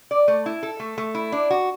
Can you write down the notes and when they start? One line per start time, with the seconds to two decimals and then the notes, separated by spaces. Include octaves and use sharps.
0.11 D5
0.28 A3
0.46 E4
0.63 A4
0.80 A3
0.98 A3
1.15 E4
1.32 D4
1.50 F#4